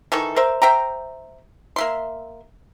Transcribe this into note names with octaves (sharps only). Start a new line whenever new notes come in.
D#3 E3 A4 C#6
A#4 C5 E5
C5 E5 G5 A#5
A#3 E5 C6